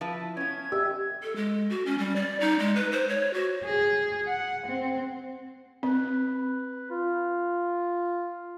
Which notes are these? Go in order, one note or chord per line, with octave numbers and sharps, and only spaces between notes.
F3 E4 B4
B3 C#4 G#6
G4 E5
A4
G#3
F#4
C#4
G3
D5
D#4
G#3
B4
C5
C#5
F#4
G#4
F#5
C4
C4 B4
F4